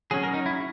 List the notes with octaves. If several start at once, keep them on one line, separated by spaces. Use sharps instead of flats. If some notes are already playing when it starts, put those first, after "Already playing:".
F#3 C#4 G#4
A#4
D#4
E4